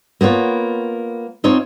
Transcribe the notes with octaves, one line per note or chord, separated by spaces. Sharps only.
A#3 B3 F4 C#5
C4 D#4 F4 C#5